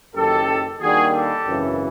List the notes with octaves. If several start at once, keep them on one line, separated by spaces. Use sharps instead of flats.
F#1 F#2 D#3 G4 A4
D#2 D#3 G3 A#3 D4 F#4 G#4
G4 A4
G#1 F#2 C#3 E3